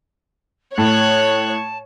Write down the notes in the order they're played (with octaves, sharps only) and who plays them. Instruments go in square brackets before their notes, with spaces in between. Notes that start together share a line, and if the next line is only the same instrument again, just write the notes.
[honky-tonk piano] A2 [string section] C#5 [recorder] A5 [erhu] F#6